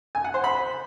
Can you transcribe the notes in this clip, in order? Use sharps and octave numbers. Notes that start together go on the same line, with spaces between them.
G#5
F#5
C5
B5